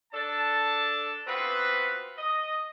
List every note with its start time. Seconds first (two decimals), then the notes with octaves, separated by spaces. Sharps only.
0.13 D4 A4 A5
1.27 B3 C4 F4 F#4 B4
2.18 D#5